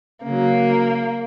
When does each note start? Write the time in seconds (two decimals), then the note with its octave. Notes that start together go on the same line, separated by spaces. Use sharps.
0.24 C#3 F#3 A#3